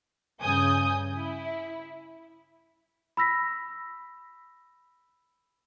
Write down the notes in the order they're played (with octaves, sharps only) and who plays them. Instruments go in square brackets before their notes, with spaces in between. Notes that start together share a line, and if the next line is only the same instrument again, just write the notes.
[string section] G2 C#3 G#5 D#6 G6
E4
[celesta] B5 E6 A#6 B6